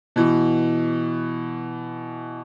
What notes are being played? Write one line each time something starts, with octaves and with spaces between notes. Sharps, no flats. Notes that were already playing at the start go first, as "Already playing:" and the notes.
B2 E3